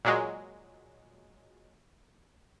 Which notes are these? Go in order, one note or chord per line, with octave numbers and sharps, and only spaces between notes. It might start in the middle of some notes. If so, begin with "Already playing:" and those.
A#2 F#3 G#3